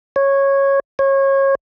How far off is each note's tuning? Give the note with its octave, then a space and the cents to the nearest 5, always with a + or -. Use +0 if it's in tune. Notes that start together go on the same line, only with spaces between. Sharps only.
C#5 -10
C#5 -25